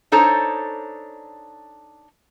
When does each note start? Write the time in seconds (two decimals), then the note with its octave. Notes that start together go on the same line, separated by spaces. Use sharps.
0.12 D4 D#4 A4 C5 C#5